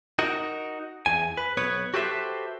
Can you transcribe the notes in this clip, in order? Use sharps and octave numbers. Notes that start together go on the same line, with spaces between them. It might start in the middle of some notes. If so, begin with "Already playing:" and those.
D#4 F#4 A#4
E2 G#5
B4
B1 B3 B4 C#5
F#4 G4 A4 B4 C5 E5